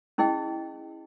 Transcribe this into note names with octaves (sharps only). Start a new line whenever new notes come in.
C#4 E4 G#4 D#5 G5